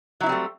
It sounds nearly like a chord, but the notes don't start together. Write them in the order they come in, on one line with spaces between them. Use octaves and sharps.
F#3 E4 C4 G3 A3